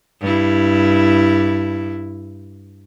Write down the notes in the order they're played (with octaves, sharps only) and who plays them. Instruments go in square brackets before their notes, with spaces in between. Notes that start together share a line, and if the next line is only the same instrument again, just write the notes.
[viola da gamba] G2 E4